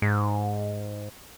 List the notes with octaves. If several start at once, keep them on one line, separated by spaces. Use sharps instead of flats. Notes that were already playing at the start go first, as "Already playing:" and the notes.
G#2